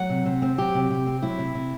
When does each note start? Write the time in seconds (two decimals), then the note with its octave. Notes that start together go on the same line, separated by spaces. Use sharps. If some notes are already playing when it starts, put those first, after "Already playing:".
Already playing: F#3 F#5
0.10 C3
0.26 C3
0.42 C4
0.58 F#3 G4
0.74 C3
0.90 C3
1.06 C4
1.22 F#3 E4
1.39 C3
1.55 C3